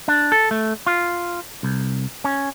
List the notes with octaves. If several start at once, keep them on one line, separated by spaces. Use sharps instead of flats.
D4
A4
A3
F4
C2
C#4